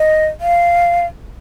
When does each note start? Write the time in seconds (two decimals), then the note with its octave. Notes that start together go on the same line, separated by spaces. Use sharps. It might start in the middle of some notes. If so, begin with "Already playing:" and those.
Already playing: D#5
0.41 F5